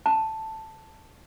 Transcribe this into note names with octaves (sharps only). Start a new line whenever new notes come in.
A5